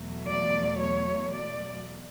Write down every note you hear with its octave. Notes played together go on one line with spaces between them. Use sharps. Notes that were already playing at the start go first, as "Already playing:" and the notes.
Already playing: E2 B2 F#3 A3
D5
C#5
D5